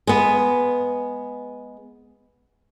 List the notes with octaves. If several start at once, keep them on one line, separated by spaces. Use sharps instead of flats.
G#3 B3